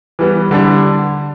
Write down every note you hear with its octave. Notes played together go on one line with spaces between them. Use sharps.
E3 G3 B3
D3 G3 D4
D3